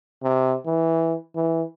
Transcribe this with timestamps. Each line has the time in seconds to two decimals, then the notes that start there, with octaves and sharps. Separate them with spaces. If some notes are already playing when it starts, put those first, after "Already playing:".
0.23 C3
0.66 E3
1.35 E3